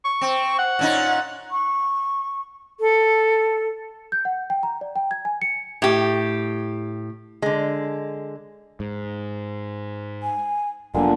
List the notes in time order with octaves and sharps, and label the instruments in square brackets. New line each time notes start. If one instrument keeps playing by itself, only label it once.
[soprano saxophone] C#6
[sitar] C4
[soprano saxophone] F#5
[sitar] A#2 C#4 D#4
[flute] C#6
A4
[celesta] G6
F#5
G5
A#5
D5
G5
G#6
G#5
C#7
[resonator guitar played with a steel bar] A2 G4
D3 G#3
[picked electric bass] G#2
[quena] G#5
[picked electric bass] F1 F#3 B3 [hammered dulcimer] A#2 D3 [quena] G#5